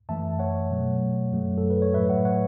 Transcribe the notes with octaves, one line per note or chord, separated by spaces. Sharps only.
F#2 E3 A3 E5 A5
C#5 F#5
B2 F#3 A3
F#2 F#3 A3
A4
B4
C#5
A2 F#3 A3 B4 E5
C#5 F#5
C#5 F#5